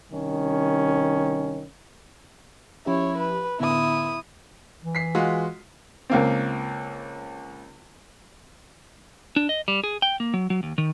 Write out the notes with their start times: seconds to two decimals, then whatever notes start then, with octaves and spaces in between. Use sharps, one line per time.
0.11 C2 D#3 C#4
2.86 F3 C#4 E4 G4 C#5
3.18 B4
3.60 A2 D3 B3 E4 D#6
4.83 E3
4.95 B6 C7
5.15 G#3 F4 F#4
6.10 C#2 A#3 C4
9.36 D4
9.49 D#5
9.68 G3
9.84 G#4
10.02 G5
10.20 A#3
10.34 F#3
10.50 F#3
10.63 D#2
10.78 D#3